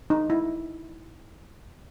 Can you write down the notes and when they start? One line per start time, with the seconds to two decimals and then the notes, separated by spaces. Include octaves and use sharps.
0.10 D#4
0.30 E4